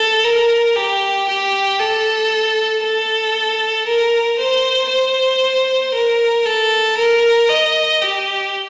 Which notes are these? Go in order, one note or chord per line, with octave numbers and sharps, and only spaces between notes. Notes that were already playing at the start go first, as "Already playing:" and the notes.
Already playing: A4
A#4
G4
G4
A4
A4
A#4
C5
C5
A#4
A4
A#4
D#5
G4